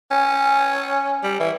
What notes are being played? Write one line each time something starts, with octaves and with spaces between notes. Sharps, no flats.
C#4
G3
E3